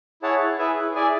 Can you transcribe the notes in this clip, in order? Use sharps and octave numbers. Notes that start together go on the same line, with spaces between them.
E4 G#4 C#5 F#5 A5
E4 G#4 B4 E5
E4 G#4 D5 G#5